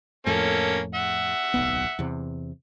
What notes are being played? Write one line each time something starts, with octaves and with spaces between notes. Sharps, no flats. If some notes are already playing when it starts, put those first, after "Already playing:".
F2 A2 A#3 C#4 A4
E5 F#5
D1 B1 B3
E2 C3